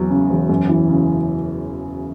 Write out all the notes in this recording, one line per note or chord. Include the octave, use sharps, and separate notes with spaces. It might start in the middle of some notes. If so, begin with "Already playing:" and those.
Already playing: E1 E2 F#3
C#3
E1
F#2
E3
C#3